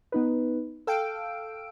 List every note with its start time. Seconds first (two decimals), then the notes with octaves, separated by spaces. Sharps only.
0.12 B3 D#4 B4
0.87 A4 F5 G5 E6 D7